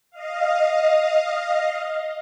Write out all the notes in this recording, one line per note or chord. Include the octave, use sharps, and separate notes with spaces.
D#5 F5